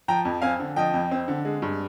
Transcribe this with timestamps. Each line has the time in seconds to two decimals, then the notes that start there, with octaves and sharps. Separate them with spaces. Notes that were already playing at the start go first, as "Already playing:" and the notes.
0.08 F3 G5 A#5
0.25 F2
0.42 C4 F5 G#5
0.60 D3
0.76 F3 D#5 G5
0.94 F2
1.11 C4
1.28 D3
1.45 G#3
1.62 G2